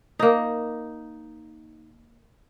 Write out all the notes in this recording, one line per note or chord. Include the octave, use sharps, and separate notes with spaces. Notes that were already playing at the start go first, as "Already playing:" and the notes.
A#3 D#4